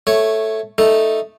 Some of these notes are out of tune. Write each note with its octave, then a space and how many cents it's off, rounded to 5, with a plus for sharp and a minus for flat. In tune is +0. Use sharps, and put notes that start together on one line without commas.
A3 +0 C#5 +0
A3 +0 D#4 +0 A4 +0